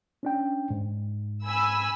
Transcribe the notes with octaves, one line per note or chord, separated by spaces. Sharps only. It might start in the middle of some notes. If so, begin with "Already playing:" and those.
C#4 D4 G5
G#2
G#5 B5 E6